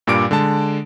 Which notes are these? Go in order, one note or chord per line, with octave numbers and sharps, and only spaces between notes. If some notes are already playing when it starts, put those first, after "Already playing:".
G2 A#2 G3 D6 D7
D3 G#3 A5